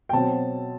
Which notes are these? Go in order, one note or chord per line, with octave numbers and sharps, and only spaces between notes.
G5
B2 F#3 C4 A5